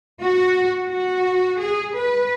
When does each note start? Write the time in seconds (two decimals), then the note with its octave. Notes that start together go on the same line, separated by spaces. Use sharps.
0.23 F#4
0.87 F#4
1.59 G#4
1.96 B4